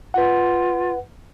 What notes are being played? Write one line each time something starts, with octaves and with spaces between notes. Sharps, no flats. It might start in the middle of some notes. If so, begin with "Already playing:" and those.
F4 B4 F#5